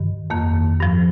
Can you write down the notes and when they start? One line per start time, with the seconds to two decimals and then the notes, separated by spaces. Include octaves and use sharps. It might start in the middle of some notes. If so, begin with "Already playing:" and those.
Already playing: G2 D#3
0.30 F2 D#3 A#3
0.80 G2 F3